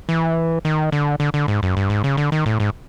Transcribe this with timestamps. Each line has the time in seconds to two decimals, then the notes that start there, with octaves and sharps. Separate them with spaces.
0.09 E3
0.65 D#3
0.92 D3
1.20 D3
1.34 D3
1.48 G#2
1.63 F#2
1.77 G2
1.90 G#2
2.04 C#3
2.17 D3
2.32 D#3
2.46 A2
2.60 G#2